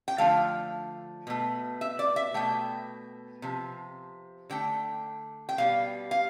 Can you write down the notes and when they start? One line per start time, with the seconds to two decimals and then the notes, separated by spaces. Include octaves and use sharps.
0.08 G5
0.18 D3 F3 A3 F5
1.27 B2 A3
1.81 E5
1.99 D5
2.16 E5
2.34 B2 A3 G5
3.42 C3 F3
4.50 D3 A3 G5
5.49 G5
5.58 B2 G3 F5
6.11 F5